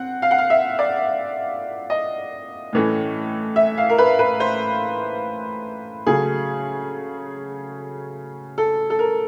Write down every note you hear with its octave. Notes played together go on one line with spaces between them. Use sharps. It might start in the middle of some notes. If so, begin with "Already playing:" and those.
Already playing: C4 F#5
F5
F#5
F5
E5
D5
D#5
A2 E3 A3 C#4
E5
F5
A#4
B4
B4
C5
C#3 F#3 A3 G#4
A4
A4
A#4